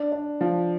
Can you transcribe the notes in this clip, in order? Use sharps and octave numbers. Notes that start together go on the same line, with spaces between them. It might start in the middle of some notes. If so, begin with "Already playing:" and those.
Already playing: D4
D4
F3